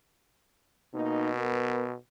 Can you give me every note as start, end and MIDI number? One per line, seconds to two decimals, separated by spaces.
0.94 1.95 47
0.94 1.30 58
0.94 1.30 63
1.37 1.87 59
1.37 1.87 70
1.37 1.87 71